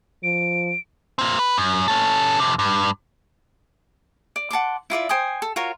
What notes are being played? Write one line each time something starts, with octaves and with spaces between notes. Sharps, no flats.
F3 D7
A#3 C4
B4
F#2
C#4 A4
F2 C3
G2
D5
F#5 A5 C6 D6
E4 F4 D5 E5
C5 G5 G#5 D#6
A4
F4 F#4 A#4 C#5